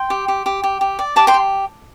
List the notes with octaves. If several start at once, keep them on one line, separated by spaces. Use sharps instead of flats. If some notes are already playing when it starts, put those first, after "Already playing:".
Already playing: G5 C6
G4
G4
G4
G4
G4
D5
G4 A5 D6
G5 C6
G4